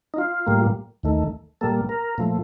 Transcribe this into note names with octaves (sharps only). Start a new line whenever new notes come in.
D#4
F4
A2 G3 A#3
D#2 D#3 A3
A#2 G3 A#3 A4
A#4
A#2 F3 A3